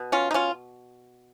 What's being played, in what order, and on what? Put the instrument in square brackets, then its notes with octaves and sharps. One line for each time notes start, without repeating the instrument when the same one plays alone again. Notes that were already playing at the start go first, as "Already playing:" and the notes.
Already playing: [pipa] B2
C#4 F4
D#4
C#4 F4